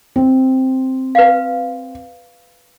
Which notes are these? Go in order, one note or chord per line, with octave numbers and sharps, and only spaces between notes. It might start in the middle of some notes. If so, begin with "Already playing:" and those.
C4
B4 F5